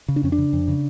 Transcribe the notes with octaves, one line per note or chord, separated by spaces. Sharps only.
C#3
D4
F2 C#4
D4
C#3
F2
C#3